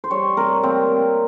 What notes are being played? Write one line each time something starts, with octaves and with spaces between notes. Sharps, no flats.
C5
G3 C#5
C3 A#4
A#3 C4